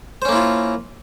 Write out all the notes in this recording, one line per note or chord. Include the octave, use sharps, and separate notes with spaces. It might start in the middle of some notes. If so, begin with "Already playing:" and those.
A#3 C#4 E4 F4 C5